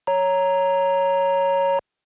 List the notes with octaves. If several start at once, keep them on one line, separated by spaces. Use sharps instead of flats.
C#5 A#5